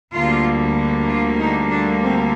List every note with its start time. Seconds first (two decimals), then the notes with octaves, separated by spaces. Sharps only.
0.13 D2 D3 G3 A#3 F4
1.07 F4
1.39 D#4
1.70 D4
2.03 C4